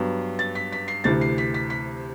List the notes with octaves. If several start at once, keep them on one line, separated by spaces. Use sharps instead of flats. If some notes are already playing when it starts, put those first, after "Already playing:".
Already playing: G2 F#3 B3
A6
B6
B6
C7
D2 C3 E3 A6
C7
B6
B6
B6